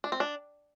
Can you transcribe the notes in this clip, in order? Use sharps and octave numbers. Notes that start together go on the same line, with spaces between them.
D4
C4
D4